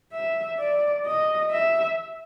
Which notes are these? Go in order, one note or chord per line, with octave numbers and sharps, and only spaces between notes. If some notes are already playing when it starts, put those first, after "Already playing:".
E5
D5
D#5
E5